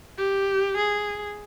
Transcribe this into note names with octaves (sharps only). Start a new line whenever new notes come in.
G4
G#4